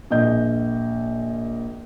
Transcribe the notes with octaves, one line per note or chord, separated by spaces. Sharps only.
A#1 D#5 G6